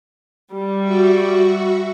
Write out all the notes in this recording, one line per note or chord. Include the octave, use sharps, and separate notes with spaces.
G3
F#4 E5 C#6